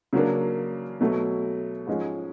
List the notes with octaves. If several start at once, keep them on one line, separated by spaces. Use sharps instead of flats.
C#3 F#3 A#3 D4
B2 F#3 A3
G#2 F3 G#3 C#4